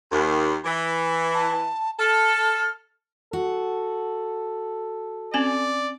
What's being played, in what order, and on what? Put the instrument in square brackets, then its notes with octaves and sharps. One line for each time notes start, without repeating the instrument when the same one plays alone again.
[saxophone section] D#2
E3
[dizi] A5
[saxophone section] A4 [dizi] F6
[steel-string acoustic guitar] F#4 [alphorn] A4
[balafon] C4 C#4 G#5 [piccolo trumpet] D5